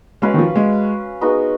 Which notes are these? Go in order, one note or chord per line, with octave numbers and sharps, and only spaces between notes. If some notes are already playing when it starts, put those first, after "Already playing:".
G#3 C#4 F#4 B4 F5
D#3
F3
G#3
G#3 B3 D#4 F#4